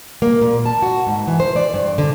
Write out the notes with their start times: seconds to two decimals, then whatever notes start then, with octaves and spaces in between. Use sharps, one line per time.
0.22 A#3
0.41 A#2
0.66 A5
0.82 F#4
1.07 G#2
1.27 E3
1.40 C5
1.56 D5
1.73 G2
1.98 D3